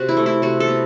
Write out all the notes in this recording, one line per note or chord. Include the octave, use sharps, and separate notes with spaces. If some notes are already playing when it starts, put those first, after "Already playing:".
Already playing: C3 F#4
E4
A3
E4
C3 F#4
A4
B3